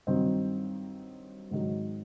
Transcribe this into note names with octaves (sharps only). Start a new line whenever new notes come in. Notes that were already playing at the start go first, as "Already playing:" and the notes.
G2 D#3 F#3 C4
G#2 D#3 F#3